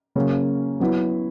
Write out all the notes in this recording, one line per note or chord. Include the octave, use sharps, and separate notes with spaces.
C#3 F#3 A#3 C#4
F#3 B3 E4